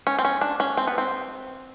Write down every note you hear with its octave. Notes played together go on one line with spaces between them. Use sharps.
C#4
C4
C#4
D4
C#4
C4
B3
C4